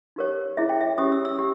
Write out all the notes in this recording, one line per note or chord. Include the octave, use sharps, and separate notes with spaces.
D#4 G4 A#4 C#5
E4 G#4 C#5 E5
G5
E5
C#4 G4 C#5 D#6
E6
E6
G4